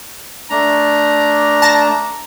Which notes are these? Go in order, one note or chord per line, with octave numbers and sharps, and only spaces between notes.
A3 D4 A#5
A5 A6 A#6